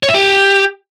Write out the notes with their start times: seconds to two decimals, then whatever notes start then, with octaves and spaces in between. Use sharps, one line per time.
0.03 C#5
0.09 E5
0.14 G4